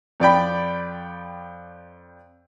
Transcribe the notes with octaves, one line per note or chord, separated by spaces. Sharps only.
F2 D5 G5 B5